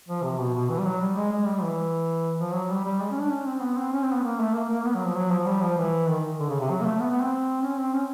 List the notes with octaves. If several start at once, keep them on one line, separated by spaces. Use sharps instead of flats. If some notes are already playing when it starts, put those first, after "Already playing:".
F3
C3
B2
B2
E3
G3
F#3
G3
G#3
G#3
G3
E3
F3
F#3
G3
G3
G#3
C#4
D4
C#4
C4
B3
C4
C#4
C4
B3
A#3
A3
A#3
A#3
B3
F#3
F3
F#3
F3
G3
F3
E3
D#3
D3
C#3
C3
F#3
A#3
A3
B3
B3
C4
C#4
C4
C#4